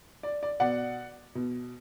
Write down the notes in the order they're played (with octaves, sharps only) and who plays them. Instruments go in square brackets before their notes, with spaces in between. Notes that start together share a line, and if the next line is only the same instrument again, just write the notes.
[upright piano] D5
D5
B2 D5 F#5
B2